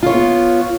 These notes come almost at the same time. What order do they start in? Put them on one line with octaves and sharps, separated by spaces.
F4 C#5 B3